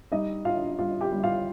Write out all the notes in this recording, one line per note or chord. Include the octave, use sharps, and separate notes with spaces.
G3 D#4 D#5
D3 F4 F5
G3 F4 F5
G4 G5
G3
F4 F5